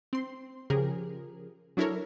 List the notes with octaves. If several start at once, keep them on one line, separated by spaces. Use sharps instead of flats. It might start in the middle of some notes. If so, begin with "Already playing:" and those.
C4 C6
C#3 F3 G4 G#4 A#4
F#3 D4 E4 A4 A#4 C#5